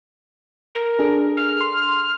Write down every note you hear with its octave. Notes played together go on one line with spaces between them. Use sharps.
A#4
D4 G#4 A4
F6
C6